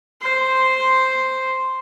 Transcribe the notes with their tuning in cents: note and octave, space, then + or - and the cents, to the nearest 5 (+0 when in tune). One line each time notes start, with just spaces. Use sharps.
C5 +0 C6 +0